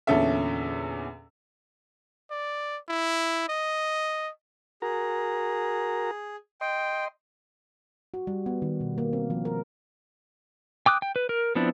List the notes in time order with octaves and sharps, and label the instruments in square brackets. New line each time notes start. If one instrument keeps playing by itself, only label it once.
[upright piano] E2 A#2 D3 C#4 A4 E5
[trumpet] D5
E4
D#5
[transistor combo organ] F#4 A#4 A#5 [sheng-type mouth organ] G#4
[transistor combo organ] D#5 C6 [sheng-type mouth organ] G5
[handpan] F#4
G3
B3
D#3
B2
A#3
C4
F3
A#4
[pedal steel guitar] G5 D6 D#6 F#6
G5
B4
A#4
F3 B3 C4 D4 E4